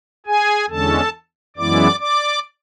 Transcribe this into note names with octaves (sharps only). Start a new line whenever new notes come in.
G#4 G#5
E2 D3 G#3 C#4 A4 A5
F#2 E3 G#3 B3 E4 D5 D6
D5 D6